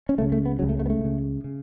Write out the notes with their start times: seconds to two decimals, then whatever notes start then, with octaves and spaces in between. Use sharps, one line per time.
0.09 C#4
0.18 C#2 C#3 A3
0.32 A3
0.46 B3
0.59 C#2 C#3 F#3
0.69 A3
0.79 A3
0.86 B3
0.90 A3
0.99 C#2
1.04 C#3
1.44 C#3